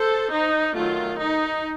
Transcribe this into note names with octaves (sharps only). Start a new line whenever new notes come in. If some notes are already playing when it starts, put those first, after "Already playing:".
Already playing: A4 C5
D#4
D#3 F#3 A3 F4
D#4